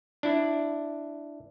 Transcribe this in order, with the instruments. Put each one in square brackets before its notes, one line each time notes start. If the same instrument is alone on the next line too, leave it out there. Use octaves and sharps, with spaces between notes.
[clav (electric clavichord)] D4 E4